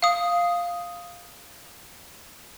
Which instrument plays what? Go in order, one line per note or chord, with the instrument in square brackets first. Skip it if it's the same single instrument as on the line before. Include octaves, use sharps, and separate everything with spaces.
[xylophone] F5 D#6